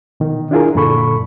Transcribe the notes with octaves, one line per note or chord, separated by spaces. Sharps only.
B2 D#3
D4 E4 F4 G#4 A#4
F#2 A#2 D3 A4 B5 C#6